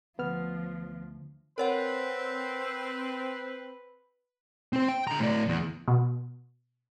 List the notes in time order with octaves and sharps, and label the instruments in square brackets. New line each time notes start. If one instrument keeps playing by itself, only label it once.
[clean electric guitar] D2 [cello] F3 [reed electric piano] B3 F6
[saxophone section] C4 [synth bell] A#4 C#5 F#5 [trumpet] B4
[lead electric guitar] C4 C5
G5
D3 A#5
A2 D5
E2
[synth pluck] B2